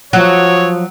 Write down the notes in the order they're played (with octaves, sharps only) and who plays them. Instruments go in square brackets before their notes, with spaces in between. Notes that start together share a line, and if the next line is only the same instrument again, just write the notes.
[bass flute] F3 [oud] F#3 [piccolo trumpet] C#5